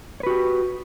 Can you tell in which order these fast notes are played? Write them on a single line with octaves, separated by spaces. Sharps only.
C#5 B4 F#4 G4